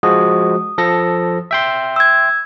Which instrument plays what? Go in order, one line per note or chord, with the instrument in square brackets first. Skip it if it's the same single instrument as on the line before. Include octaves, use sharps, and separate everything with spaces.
[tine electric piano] F3 G#3 F#4 [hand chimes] D#6
[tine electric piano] F3 A4 A#6
E5 G5 C6
[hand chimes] E6 G#6